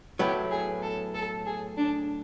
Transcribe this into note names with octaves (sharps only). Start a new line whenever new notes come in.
A2 F#3 B3 E4 G4
G#4
A4
A4
G#4
D4